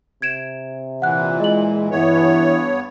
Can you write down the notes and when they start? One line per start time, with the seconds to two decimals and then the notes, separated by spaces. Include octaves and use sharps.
0.22 C3 G#6 D7 E7
1.02 A#2 E3 F#5 F#6
1.40 G#3 D#5 F#7
1.91 G2 E3 B3 C#5